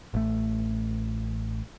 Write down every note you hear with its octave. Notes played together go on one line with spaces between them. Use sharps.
A1 A3